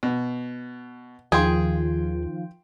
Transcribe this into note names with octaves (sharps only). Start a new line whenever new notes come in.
B2
D#2 D#3 F3 F4 G#4 G5 C6